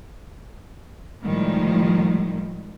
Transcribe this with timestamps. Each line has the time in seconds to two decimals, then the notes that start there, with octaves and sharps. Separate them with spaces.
1.23 A2 D#3 F3 G3 G#3